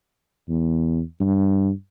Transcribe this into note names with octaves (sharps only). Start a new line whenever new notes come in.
E2
G2